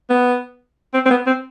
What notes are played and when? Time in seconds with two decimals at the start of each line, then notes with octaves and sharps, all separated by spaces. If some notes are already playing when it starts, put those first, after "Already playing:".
0.10 B3
0.94 C4
1.06 C4
1.11 B3
1.27 C4